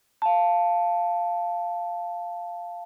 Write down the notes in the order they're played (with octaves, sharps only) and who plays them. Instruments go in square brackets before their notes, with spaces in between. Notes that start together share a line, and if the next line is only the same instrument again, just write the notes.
[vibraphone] F5 A5